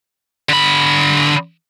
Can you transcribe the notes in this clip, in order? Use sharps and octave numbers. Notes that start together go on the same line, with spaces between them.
D3 B5